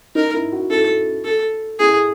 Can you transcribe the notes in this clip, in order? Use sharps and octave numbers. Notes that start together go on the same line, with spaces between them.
D#4 A#4
E4
F#4
E4 A4
A4
E4 G#4